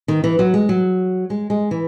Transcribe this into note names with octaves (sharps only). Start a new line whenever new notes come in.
D#3
E3
F#3
G#3
F#3
G#3
G#3
E3